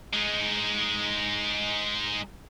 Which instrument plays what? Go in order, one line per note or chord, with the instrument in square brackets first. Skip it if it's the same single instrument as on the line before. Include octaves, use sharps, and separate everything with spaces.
[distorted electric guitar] G#3 D#4